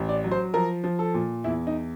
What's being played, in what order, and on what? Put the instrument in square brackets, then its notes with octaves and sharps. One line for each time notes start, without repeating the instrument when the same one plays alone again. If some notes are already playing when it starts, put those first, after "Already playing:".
Already playing: [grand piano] A1
D5
F#3
C5
F3 A#4
F3
A4
A#2
E2 E4
D#4